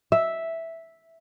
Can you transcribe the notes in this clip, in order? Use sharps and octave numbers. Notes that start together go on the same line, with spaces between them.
E5